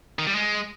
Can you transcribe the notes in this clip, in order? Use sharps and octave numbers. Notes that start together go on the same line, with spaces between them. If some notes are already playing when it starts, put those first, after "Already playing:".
D#3
G3
G#3